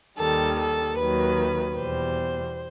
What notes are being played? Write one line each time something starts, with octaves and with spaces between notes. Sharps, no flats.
D#2 D#3 G3 A4
A4
D#2 D#3 F#3 B4
E2 B2 G3 C5